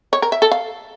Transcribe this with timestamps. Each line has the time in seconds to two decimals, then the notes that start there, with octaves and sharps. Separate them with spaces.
0.13 C#5
0.22 A#4
0.32 E5
0.42 A4
0.52 F5